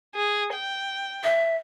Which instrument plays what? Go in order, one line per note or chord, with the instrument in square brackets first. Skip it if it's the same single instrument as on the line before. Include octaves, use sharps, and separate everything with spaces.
[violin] G#4
G5
[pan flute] E5